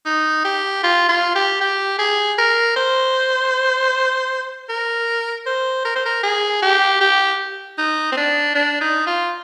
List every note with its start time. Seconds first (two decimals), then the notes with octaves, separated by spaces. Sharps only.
0.06 D#4
0.45 G4
0.84 F4
1.09 F4
1.35 G4
1.61 G4
1.99 G#4
2.38 A#4
2.76 C5
4.69 A#4
5.47 C5
5.85 A#4
5.96 C5
6.06 A#4
6.23 G#4
6.62 G4
7.01 G4
7.78 D#4
8.12 C4
8.17 D4
8.55 D4
8.81 D#4
9.07 F4